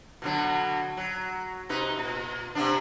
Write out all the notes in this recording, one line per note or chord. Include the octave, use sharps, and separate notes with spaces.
B2 D3 F#3
F#3
C3 D#4 B4
A#2
C3 B3 D4